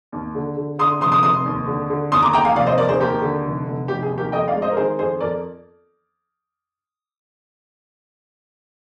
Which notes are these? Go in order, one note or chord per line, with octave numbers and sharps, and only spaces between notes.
D#2
D3
D3
D3 C6 D#6
F1 C6 D#6
C6 D#6
F1 C6 D#6
D#2
D3
D3
D#2 C6 D#6
A#5 D6
D#2 G5 A#5
F5 G#5
F1 D5 F5
C5 D#5
D#2 A#4 D5
G#4 C5
D#2 G4 A#4
D3
F1
F1
F1 G4
G#4
D#2
G4 A#4
F2 D#5 G5
D5 F5
G#3
C5 D#5
A#4
D#3 G#4 C5
F2 G#4 C5
F2 A#4 D5